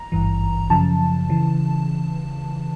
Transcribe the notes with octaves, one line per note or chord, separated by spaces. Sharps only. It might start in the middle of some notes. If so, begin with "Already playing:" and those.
Already playing: A#5
G#1 G2 E3
F#2 C#3 F3 A5
C#3 E3